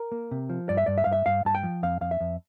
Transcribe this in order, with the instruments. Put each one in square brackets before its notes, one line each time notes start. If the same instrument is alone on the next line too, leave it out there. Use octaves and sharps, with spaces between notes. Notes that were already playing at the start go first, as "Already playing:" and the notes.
Already playing: [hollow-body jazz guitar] A#4
A#3
C3
F3
G2 D5
E5
G2 D5
E5
G2 F5
E5
G2 F5
G2 A5
G5
F3
F2 F5
F2 F5
E5
F2